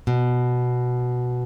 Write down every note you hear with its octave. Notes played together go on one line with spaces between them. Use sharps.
B2